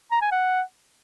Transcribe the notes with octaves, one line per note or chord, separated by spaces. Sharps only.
A#5
G#5
F#5